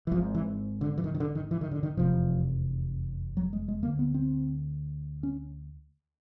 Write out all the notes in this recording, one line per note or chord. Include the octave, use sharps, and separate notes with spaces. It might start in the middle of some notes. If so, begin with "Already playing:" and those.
E3
G#1 G#2 F3
E3
D3
E3
D#3
D#3
D3
D#3
E3
D#3
D3
D#3
F1 E2 C3 F3
F#3
G#3
G#3
D2 D3 A#3
B3
C4
C#4